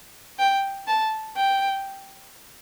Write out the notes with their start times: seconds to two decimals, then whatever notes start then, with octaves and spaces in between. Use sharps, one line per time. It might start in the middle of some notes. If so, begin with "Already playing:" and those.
0.39 G5
0.87 A5
1.36 G5